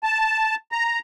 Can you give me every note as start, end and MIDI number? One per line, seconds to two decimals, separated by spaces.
0.04 0.55 81
0.72 0.99 82